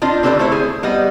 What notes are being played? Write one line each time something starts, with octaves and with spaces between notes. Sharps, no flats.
C4 D4 F4 D#5
D3 C4 G4 B4 D5
A3 E4 C5
G#4
G3 B3 D#5